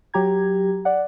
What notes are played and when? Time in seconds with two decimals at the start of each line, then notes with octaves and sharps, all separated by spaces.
0.14 F#3 G4 A#5 G#6
0.85 D5 F#5